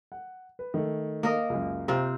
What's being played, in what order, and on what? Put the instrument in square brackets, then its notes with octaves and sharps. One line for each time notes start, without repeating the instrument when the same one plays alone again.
[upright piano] F#5
B4
D#3 A3
[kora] A#3 A#4 D#5
[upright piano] C#2 F#2
[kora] C3 C4 F4 [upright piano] A#5